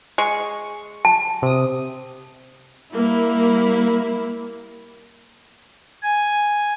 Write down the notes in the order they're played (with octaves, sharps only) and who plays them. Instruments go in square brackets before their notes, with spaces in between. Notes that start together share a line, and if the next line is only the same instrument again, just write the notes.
[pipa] G#3 [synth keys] C#6
[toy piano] A5
[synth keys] C3 D#6
[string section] G3 A#3 E4
[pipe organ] G#5